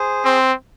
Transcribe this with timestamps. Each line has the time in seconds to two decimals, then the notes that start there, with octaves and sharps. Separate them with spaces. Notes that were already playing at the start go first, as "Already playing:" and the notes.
Already playing: G#4 C5
0.25 C4